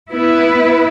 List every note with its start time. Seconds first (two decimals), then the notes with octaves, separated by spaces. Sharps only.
0.11 B3 E4 B4